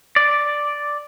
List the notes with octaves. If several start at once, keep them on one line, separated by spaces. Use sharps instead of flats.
D5